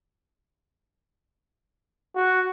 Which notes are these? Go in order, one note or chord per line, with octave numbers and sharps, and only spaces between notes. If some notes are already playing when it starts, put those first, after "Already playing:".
F#4